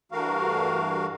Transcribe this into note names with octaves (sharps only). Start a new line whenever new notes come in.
G2 E3 A3 F#4 A#4 F5